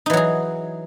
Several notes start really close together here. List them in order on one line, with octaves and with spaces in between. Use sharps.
D#4 E3 F#3 G#4